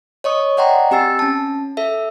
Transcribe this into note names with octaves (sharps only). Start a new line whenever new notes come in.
C#5 D#5 C#6 D#6
D5 D#5 F#5 G5 A#5 C6
C4 G4 G#5 E6 A6 C7
C#4 A5
A4 E5